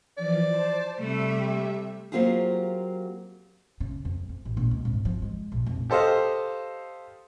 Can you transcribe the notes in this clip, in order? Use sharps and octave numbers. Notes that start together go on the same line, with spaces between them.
E3 F3 D5
C5 A5
C3 G3 A3 E5
G4
F#3 A#3 C4 F4 G4 G#4
C#3
F2
F2
A1
A#1
C#2
G#1
F3
G#3
A#1
F1
G4 A4 C5 D#5 F5